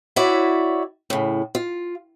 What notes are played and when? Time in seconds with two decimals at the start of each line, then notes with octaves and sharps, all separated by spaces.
0.16 E4 F#4 C#5 D5 E5
1.10 A2 C#3
1.55 F4